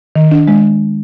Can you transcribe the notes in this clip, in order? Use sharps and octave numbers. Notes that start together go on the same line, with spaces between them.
D#3
D4
G#3